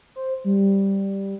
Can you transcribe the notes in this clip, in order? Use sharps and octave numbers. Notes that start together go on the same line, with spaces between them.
C5
G3